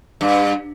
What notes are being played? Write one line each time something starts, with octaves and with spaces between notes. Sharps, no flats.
G2